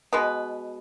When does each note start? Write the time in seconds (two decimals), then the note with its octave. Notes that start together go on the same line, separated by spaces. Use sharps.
0.13 B2 G#3 B3 B4